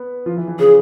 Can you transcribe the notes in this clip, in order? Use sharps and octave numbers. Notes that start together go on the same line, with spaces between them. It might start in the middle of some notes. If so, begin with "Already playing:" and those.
Already playing: B3 B4
F3 F4
E3 E4
E3 E4
C#3 C#4 G#4